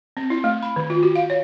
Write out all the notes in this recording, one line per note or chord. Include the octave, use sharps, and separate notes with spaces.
C4
E4
A3
B5
D#3
F4
F#4
F5
C#5